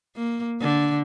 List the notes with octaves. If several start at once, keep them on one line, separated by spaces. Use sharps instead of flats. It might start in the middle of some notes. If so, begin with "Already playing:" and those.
A#3
D3